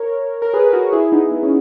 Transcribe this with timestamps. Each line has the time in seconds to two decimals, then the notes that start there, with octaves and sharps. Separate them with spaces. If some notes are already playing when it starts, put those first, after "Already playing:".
Already playing: A#4 C#5
0.42 A#4
0.54 G#4 B4
0.66 B4
0.73 F#4 A#4
0.92 E4 G#4
1.12 B3 D#4
1.31 B3
1.43 C#4